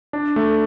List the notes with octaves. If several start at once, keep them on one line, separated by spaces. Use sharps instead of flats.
D4
A3